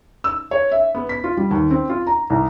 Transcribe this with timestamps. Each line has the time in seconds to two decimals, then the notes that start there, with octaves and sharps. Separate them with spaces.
0.24 E6
0.51 C#5
0.71 E5
0.95 B3
1.09 B6
1.24 F4
1.37 G3
1.51 D#2
1.71 C4
1.89 F4
2.07 A#5
2.30 C2